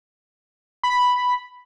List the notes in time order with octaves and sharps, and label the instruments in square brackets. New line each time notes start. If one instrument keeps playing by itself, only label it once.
[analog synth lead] B5